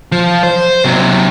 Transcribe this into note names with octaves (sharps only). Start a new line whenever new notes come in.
F3
C5
C3 F#3